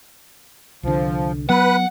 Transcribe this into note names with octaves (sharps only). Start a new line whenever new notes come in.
C2 D3 F3
F#3 B3 B4 F#5 F#6